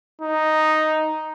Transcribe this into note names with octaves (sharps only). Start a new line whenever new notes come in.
D#4